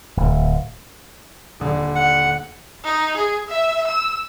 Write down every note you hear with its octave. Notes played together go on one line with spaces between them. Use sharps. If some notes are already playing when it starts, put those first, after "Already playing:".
D1
D#1 D3
F#5
D#4
G#4
E5
E6